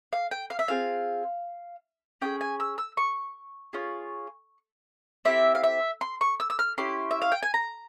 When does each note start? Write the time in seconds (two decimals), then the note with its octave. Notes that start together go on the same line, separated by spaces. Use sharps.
0.13 F5
0.31 G5
0.50 F5
0.59 E5
0.68 C4 F4 G#4 F5
2.22 C#4 F4 G#4 G5
2.41 G#5
2.60 E6
2.78 E6
2.97 C#6
3.73 C#4 F4 G#4
5.25 C4 E4 G4 E5
5.55 F5
5.64 E5
6.01 C6
6.21 C#6
6.40 E6
6.50 E6
6.59 F6
6.78 C#4 E4 G4 C6
7.11 E5
7.22 F5
7.32 G5
7.43 G#5
7.54 A#5